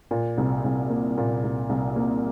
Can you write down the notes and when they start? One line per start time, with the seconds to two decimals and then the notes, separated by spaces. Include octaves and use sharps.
0.11 A#2
0.38 C2
0.64 C2
0.90 A#3
1.18 A#2
1.44 C2
1.69 C2
1.96 A#3